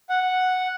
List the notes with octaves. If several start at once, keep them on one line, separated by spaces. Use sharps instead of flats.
F#5